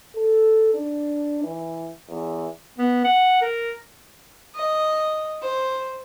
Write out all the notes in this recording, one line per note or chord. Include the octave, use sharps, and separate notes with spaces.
A4
D4
E3
E2
B3
F#5
A#4
D#5
C5